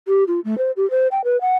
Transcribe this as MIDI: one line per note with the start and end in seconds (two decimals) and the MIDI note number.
0.08 0.24 67
0.28 0.40 65
0.45 0.57 57
0.58 0.71 72
0.77 0.89 67
0.90 1.07 72
1.11 1.22 79
1.24 1.39 71
1.41 1.57 78